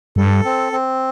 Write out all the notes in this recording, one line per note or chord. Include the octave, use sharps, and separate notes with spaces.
G2 A4
C4
C4